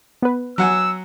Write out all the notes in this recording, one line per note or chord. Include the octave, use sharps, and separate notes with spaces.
B3 B4
F#3 F#5 G#5 E6